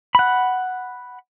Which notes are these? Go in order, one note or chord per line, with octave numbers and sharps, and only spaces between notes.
F#5 B5